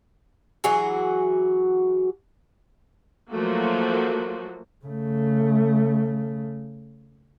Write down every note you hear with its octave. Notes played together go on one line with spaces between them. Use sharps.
E3 F#3 F#4 G#4
F3 F#3 A3 A#3 F#4
C#3 A3